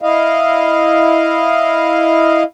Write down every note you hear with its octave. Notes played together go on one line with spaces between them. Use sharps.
E4 D#5 F5